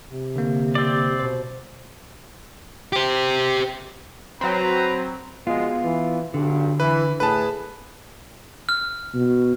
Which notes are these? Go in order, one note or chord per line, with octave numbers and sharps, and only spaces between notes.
C3
D3 A#3
C4 D5
B2 C5
G4 C5
F#3 C4 B4 A#5
B2 F3 G#3 B3 F4
E3
B1 G2 D3
E3 B4
A2 G#4 B4 A5
F6
B2